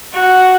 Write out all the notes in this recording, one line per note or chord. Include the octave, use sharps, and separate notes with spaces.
F#4